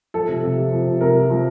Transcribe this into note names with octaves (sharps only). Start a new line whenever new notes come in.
F3 A4
C3
C3
F3
F3
C3
C3 A#4
F3
F3